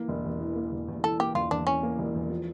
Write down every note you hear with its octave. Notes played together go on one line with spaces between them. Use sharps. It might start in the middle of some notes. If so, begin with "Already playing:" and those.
Already playing: E3 A#3
E1
E2
E3
A#3
E1
E2
E3 A4
A#3 G4
E1 F4
E2 D4
E3 C#4
A#3
E1
E2
F3